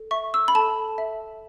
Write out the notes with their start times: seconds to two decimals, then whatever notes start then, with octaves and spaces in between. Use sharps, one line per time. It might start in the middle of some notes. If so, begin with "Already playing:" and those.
Already playing: A4
0.11 E5 C#6
0.34 E6
0.48 B5
0.55 A4 A5
0.98 E5